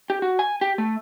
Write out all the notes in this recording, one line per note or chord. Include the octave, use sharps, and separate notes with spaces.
G4
F#4
G#5
G4
A3